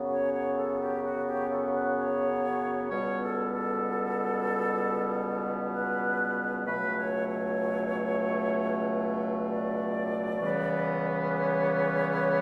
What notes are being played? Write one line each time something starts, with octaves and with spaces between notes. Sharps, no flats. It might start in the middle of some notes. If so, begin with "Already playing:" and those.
Already playing: F#2 C#3 F#3 B3
C#5
C#5
A4
G4
F#4
G4
A4
B4
C#5
C#2 B2 G3 B3 C#5
A4
A4
B4
C#2 B2 F#3 A3 B4
C#5
C#5
D5
C#2 C#3 E3 G3 B3
C#5